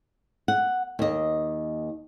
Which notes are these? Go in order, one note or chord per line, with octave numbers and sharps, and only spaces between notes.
F#5
D#2 D#5